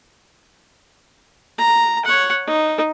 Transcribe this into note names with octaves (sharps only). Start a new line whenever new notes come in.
A#5
C#5 F#5
D#4